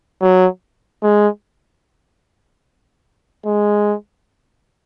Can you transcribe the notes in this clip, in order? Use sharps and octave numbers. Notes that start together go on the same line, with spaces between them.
F#3
G#3
G#3